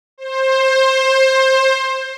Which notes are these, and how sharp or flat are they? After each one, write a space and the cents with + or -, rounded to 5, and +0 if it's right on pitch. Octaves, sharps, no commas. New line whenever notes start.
C5 +20